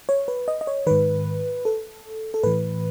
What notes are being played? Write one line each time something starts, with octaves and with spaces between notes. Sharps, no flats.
C#5
B4
D#5
D#5
C#5
G#2 D#3 B4
A4
A4
A2 E3 B4